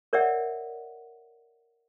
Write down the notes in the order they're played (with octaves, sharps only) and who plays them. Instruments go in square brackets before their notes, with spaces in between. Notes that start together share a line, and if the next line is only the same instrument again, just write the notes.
[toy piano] A#4 C#5 D5 E5 F#5